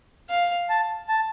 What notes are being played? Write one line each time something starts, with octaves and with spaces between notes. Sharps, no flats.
F5
A5
A5